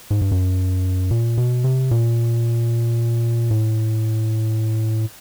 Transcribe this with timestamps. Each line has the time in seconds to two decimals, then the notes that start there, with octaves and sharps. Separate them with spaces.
0.11 G#2
0.21 G2
0.32 F#2
1.11 A#2
1.38 B2
1.64 C3
1.91 A#2
3.51 A2